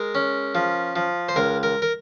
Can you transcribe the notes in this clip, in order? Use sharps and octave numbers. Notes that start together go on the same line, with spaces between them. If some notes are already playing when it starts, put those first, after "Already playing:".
Already playing: G#3 A#4
C#4
F3
F3
C5
C#2 A#4
A#4
A#4